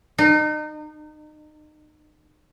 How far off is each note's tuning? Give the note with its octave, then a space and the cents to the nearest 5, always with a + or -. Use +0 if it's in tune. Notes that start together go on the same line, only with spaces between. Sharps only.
D#4 -35